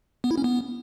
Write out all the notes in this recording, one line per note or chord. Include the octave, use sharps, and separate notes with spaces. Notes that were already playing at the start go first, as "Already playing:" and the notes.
B3
E4
C#4
B3